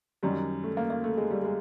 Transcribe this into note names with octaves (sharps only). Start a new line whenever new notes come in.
F#2 D#3 F#3 G3
A3
A#3
A#3
A3
G#3
G3
G#3